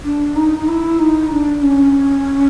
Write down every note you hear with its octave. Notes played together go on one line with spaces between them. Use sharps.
D4
D#4
D#4
E4
D#4
D4
C#4